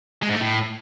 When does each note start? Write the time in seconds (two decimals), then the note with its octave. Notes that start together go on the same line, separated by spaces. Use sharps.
0.23 G#3
0.29 G#2
0.35 A3
0.41 A2